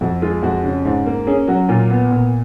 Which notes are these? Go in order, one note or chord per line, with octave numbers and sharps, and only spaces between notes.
F2 F#4
G#3 F4
F2 F#4
C#3
G#2
A#3
C#4 G#4
F#3 F#4
A#2 F4
B3
A#2